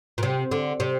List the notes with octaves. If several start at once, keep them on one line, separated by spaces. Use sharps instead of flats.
A#2
C3
D3
C3